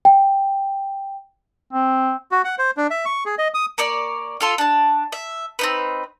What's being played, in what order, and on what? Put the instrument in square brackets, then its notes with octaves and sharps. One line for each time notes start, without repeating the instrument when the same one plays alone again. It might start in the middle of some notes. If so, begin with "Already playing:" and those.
[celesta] G5
[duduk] C4
[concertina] F#4
F#5
C5
D4
E5
C#6
G#4
D#5
D#6
[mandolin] A#3 C#5 D5
F4 A4 C6
D4 A5
E5
C4 D#4 B4